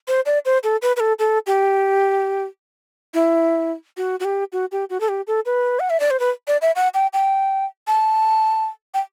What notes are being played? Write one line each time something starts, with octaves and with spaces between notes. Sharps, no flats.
C5
D5
C5
A4
B4
B4
A4
A4
G4
E4
F#4
F#4
G4
F#4
G4
F#4
A4
G4
A4
B4
F#5
E5
D5
C5
B4
D5
E5
F#5
G5
G5
A5
G5